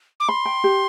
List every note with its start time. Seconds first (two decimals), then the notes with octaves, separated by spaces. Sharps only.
0.20 D6
0.28 B5 C6
0.45 G5
0.64 G4